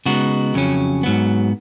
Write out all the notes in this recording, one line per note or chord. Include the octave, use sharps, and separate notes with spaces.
C#3 G#3 B3 D#4 F#4
F2 C#3 F#3 C#4
G#2 F#3 B3